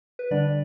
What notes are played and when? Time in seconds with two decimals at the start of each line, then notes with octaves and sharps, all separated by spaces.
0.19 B4
0.31 D3 G3 D4 D5